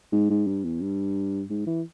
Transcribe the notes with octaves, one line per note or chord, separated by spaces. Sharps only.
G#2
G#2
G2
E2
G2
G#2
E3